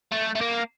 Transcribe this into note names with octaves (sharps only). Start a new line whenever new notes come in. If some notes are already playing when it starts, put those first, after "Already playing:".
A3
A3
A#3